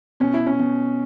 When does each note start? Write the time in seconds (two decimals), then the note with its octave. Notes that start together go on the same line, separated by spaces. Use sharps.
0.20 B2 C#4
0.34 E4
0.47 C#4
0.59 B2